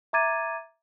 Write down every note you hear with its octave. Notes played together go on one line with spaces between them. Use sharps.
E5 A#5 D6 G#6 A6 D#7